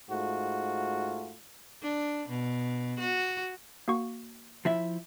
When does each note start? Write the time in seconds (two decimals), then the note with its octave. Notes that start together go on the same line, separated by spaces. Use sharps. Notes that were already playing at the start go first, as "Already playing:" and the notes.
0.11 G#2 A3 F4 F#4
1.82 D4
2.29 B2
3.00 F#4
3.88 A#3 F#4 C#6
4.65 F3 E4 E5